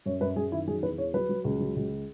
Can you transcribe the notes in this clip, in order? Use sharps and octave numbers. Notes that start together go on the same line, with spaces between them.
F#2 C#5
F#2 B4
F#2 G#4
D#3 E4
F#3 G#4
E2 B4
E2 C#5
F#3 B4
F#3
C#2
F#3
C#2